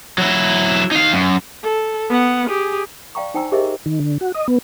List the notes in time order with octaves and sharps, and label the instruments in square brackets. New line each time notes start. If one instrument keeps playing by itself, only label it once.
[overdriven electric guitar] F#3 E4
D#4 F5
F#2
[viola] A4
B3 F#5
G4 G#4
[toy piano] D5 F5 G5 A#5 C#6
D#4 C5 G5 G#5 A#5 E6
G4 G#4 A#4 C5 D#5 E5
[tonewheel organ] D#3
D3
F#4
D#5
B3